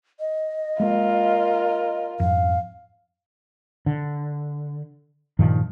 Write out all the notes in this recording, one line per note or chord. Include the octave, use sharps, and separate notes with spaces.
D#5
G#3 A#3 F4 A#4
F2 G#2 F5
D3
G2 A#2 D#3 F3